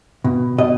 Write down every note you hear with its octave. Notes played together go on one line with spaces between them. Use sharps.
B2
B2 D#5